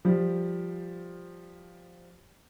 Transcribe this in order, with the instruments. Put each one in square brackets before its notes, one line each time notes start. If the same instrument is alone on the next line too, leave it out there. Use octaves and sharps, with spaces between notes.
[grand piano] F3 G3